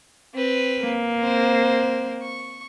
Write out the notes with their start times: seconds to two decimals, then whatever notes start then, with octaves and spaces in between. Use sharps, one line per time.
0.34 C4 B4
0.81 A#3
1.20 C4 C5
2.22 C#6